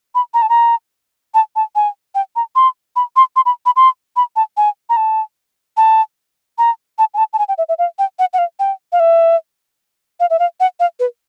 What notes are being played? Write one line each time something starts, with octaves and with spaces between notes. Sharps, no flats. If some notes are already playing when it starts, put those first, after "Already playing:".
B5
A#5
A5
A#5
A5
A5
G#5
G5
A#5
C6
B5
C6
C6
B5
B5
C6
B5
A5
G#5
A#5
A5
A5
A#5
A5
G#5
A5
A5
G#5
G5
E5
E5
F5
G5
F#5
F#5
F5
G5
F5
E5
F5
E5
F5
F#5
F5
B4